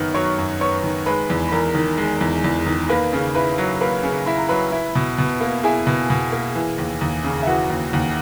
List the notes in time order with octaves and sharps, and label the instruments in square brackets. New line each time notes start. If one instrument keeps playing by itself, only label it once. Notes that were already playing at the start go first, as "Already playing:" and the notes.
Already playing: [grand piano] F#2 D#3 B3
[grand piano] F#3 [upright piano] C#5 C#6
[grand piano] F#2
[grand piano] B3 [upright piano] C#5 C#6
[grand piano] D#3
[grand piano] G#3 [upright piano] B4 B5
[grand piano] E2
[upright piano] B5
[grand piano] E2 [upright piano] A#4 A#5
[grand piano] D#3
G#3
E2
E2
D#3
[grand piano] A#3 [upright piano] B4 B5
[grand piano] C#3
[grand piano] E4 [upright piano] B4 B5
[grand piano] F#3
[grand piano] A#3 [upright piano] B4 B5
[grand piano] C#3
[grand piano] E4 [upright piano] B5
[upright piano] A#5
[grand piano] F#3 [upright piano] B4 B5
[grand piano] E4
B2
B2
A#3
[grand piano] E4 [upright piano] G#4 G#5
[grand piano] B2
B2
A#3
E3
D#2
D#2
C#3
[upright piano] E5
[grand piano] E3 [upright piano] F#4 F#5
[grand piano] D#2
D#2